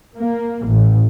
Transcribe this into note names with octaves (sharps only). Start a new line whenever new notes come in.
A#3
A1